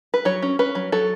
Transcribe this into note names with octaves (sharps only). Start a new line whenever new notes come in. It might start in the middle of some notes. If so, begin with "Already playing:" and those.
B4
F#3 C#5
C#4
C#4 B4
F#3
F#3 A4